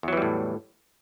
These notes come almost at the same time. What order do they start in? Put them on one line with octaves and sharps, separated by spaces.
E2 F#3 E3 G3 A2